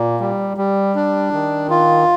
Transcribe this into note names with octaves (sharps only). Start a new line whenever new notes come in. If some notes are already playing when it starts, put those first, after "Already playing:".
Already playing: A#2
G3
G3
D4
D#3
F4